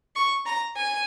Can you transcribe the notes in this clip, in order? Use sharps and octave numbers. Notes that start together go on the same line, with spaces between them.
C#6
A#5
G#5